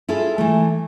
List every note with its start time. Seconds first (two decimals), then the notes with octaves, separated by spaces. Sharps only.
0.09 E4 F4 G#4 A4
0.38 E3 A3